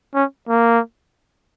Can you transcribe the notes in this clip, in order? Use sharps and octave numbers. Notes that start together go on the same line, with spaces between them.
C#4
A#3